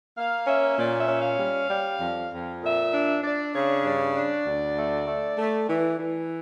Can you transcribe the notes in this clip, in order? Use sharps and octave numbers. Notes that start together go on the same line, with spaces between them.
A#3 F5
C#4 E5
A#2 D5
E5
C#4
F5
G3
G3
F2
F2
A#2 E5
D4
D4 D5
C#3 C#5
G2 D5
D4
D2
A3
A3
A3
E3
E3